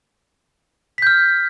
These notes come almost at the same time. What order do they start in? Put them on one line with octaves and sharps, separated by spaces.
B6 G6 F6